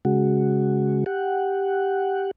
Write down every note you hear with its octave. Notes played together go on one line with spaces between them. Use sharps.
C#3 G#3 F#4
G4 F#5